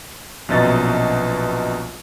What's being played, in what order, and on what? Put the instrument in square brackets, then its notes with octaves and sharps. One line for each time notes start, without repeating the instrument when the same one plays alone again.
[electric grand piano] A#1 F#2 B2 D#5 A6